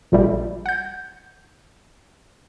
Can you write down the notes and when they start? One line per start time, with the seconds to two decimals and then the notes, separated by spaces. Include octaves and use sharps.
0.12 A#1 A#2 G3 A3
0.66 F#5 G6